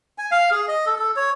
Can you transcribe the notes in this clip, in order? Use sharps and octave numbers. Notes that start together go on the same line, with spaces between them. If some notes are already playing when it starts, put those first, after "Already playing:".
G#5
F5
G#4
D#5
A4
A4
C#5